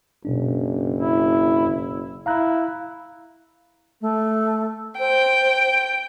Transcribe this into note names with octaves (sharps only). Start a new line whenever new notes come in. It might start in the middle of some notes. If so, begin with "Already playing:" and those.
F#1 B2 D4
E4
E4 F5 A#5 F#6
A3
C5 G5